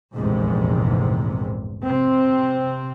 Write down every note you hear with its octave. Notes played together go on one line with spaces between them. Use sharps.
F1 A#1 E2 G#2 C3
C3 C4